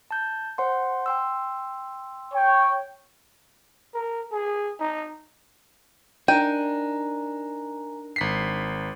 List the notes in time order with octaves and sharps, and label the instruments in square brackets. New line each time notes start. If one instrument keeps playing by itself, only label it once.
[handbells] A5 G6
C5 F#5 C6
G5 C6 E6
[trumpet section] C#5 G5
[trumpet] A#4
G#4
D#4
[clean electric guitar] D4 D#4 [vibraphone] A#4 G#5 A#5 [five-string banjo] G5 [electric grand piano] D#7
[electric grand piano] G#1 B6 C7